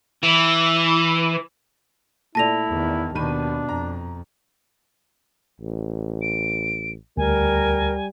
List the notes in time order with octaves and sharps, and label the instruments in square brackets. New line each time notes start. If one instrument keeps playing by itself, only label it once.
[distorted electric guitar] E3
[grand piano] A#2 A3 D5 [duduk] E4 [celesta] A5 A#6 F7
[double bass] E2 D#3
[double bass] D#2 B2 [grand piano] D#3 B5 D#7 [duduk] D4
[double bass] F2 [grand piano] A#5
[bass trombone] A1
[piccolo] D7
[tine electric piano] D2 [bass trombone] G3 [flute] A#4 [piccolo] G#5